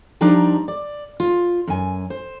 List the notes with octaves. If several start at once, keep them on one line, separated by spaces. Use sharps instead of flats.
F3 G3 D4 D#4 D5 A#5
D5
F4
F#2 G#5
C5